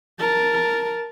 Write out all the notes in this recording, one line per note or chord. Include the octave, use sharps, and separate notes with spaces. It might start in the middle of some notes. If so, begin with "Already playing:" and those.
A#4 A5